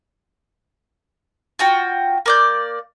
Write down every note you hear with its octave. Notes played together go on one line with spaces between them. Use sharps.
F4 F#4 G5
A#3 D5 G6